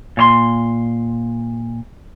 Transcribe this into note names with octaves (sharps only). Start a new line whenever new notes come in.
A#2 C#5 C6